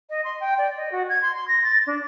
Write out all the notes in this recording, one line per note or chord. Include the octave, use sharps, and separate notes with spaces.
D#5
C6
G5
D5
D#5
F#4
G#6
C6
C6
A#6
A6
D4